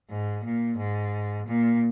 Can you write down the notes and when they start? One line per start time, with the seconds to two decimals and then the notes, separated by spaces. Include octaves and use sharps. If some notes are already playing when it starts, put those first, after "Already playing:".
0.10 G#2
0.44 A#2
0.78 G#2
1.47 A#2